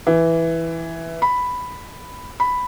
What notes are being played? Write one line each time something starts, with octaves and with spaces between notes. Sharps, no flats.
E3
B5
B5